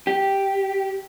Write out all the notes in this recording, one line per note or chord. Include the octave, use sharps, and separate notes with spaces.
G4